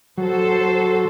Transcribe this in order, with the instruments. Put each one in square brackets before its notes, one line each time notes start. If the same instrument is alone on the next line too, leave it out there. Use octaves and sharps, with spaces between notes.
[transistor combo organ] F#3 [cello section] A4 C5